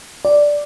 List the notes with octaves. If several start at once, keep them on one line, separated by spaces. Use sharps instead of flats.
D5